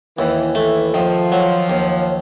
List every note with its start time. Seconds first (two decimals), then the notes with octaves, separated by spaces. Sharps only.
0.17 D#2 E3
0.55 E3 A3
0.94 D#3 F3
1.32 F#3
1.70 D#2